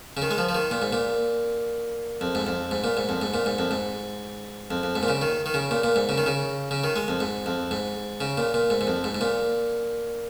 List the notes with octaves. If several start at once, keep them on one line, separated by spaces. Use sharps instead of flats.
C#3
D#3
G#3
F3
F3
D#3
A#2
G#2
A#2
F2
G#2
F2
G#2
A#2
G#2
F2
G#2
A#2
G#2
F2
G#2
F2
F2
G#2
A#2
C#3
D#3
D#3
C#3
A#2
A#2
G#2
C#3
D#3
C#3
C#3
D#3
G#3
F2
G#2
F2
G#2
C#3
A#2
A#2
G#2
G#2
F2
G#2
G#2
A#2